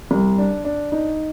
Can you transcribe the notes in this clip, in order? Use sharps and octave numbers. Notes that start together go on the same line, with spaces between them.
C2
D4
D4
D#4